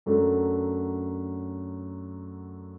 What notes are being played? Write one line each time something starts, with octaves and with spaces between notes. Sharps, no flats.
F#2 F#3 A3 D4